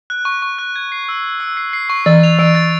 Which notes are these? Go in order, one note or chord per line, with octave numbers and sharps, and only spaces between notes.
F#6
C#6
C#6
F#6
G#6
C7
E6
E6
E6
C7
C7
C#6
E3 A6
F7
E3 D7
A6